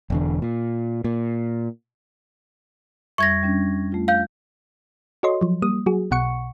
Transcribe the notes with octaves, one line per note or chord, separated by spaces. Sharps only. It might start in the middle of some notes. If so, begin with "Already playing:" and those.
E1 E2 D3
A#2
A#2
F2 G3 E5 C#6 G#6 A#6
G3 C#4 D4
A3 F4
F5 G6
F#4 A4 C#5 D#5 C6
F3 F#3
G3 A#3 D#6
F#3 F#4 G#4
B1 B2 F#5 C#6 C#7